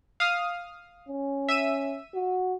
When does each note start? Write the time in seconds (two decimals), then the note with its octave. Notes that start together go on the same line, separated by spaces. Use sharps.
0.20 F5 D#6 F6
1.09 C#4
1.49 E5 E6 D#7
2.14 F#4